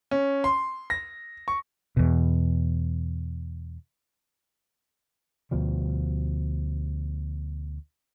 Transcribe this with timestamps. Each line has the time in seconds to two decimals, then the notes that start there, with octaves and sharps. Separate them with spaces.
0.11 C#4
0.44 C6
0.90 A#6
1.48 C#6
1.97 E2 B2
5.51 D2 B2 F3 G3